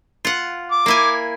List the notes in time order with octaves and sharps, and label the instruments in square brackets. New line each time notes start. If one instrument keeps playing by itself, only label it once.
[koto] F4 F#5
[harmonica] D6
[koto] A#3 E4 G#5